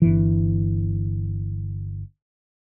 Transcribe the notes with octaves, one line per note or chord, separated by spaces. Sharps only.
G1 E3